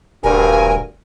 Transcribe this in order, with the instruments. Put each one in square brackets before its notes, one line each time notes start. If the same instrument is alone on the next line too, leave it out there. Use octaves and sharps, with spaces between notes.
[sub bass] D#1 [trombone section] D2 G2 [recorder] A#4 [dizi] G#5